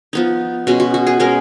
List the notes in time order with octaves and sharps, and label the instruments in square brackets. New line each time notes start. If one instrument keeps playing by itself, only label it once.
[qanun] F3 B3 D#4
B2 G#3 C#4 F#4
F#4
F#4
G#4
B2 G#3 C#4 A#4